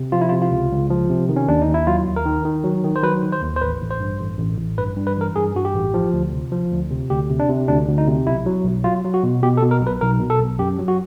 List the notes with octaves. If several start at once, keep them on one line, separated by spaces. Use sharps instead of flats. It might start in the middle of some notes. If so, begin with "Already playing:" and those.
Already playing: C3
F3 F4
E4
F4
C3
F4
C#2
C#2
F3
C3
D#3
C#4
D#2 D4
D#4
D#2
E4
F#3 F4
D#2
A#4
D#3
D#3
F#3
D#3
C5
F#3 B4
D#3
C5
D#2
C5
A1 B4
A1
C5
G2
A1
A1
A1
G2 B4
G2
B4
E3 A#4
G2 G#4
G2 F#4
G4
A1
F3
D2
C3
F3
D2
C3
D2 G4
C3
D4
C3
D2 D4
D2
D#4
C3
B1 E4
F#3
B1
F#3 F4
F#3
F#4
B2
B2 G4
A4
B2
A#4
B1
B4
B1 A#4
B2
A4
B1
F#2 G4
F#3
F#4